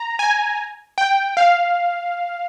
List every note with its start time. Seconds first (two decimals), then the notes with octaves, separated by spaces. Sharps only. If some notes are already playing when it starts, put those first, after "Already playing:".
Already playing: A#5
0.19 G#5
0.98 G5
1.37 F5